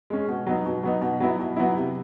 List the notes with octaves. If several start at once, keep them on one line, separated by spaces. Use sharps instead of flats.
G#3 C#4
B2
F#3 B3 D#4
B2
F#3 B3 D#4
B2
F#3 B3 E4
B2
F#3 B3 E4
C3